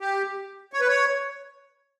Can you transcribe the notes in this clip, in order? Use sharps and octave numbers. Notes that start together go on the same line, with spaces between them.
G4
C#5
B4
C#5